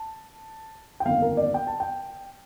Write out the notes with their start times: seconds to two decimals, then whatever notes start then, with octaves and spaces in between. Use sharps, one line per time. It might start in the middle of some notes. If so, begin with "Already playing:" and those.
Already playing: A5
1.00 G5
1.05 G1 F2 D#3 A#3 F5
1.22 A#4
1.37 D5
1.54 G5
1.67 A5
1.80 G5